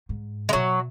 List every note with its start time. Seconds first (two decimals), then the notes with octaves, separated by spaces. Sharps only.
0.09 G#2
0.49 G#3
0.53 B2 F#3